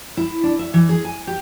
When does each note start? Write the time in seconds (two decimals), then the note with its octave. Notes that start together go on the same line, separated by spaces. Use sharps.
0.17 E4
0.43 D4
0.59 E5
0.74 E3
0.89 G#4
1.05 G#5
1.27 G4